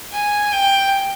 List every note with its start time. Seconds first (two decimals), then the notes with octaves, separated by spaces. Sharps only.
0.12 G#5
0.52 G5